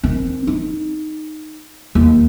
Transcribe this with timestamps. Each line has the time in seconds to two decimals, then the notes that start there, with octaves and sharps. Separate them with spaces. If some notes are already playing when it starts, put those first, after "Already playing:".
0.03 D#3 C4
0.47 D#4
1.95 D#2